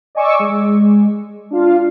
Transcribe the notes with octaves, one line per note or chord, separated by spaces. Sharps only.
D5 D#5 G#5 C#6 D6 E6
G#3
D4 F4 F5